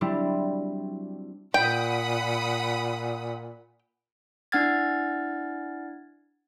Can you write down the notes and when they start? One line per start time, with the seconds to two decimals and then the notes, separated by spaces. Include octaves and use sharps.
0.01 F#3 G3 C4 D4 E4 G4
1.54 A#2 F#5 G5 B5 D#6
4.52 D4 E4 F#5 F6 G#6 A6